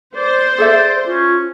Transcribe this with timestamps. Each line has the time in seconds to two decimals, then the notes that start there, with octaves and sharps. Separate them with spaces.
0.15 C5 D5
0.58 G#4 A4 D5 E5
1.07 C#4 F4